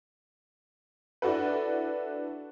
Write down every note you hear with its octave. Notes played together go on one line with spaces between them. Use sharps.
D4 E4 F#4 A4 B4